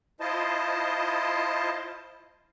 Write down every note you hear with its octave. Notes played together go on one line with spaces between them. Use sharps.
E4 F4 C5 D#5 A5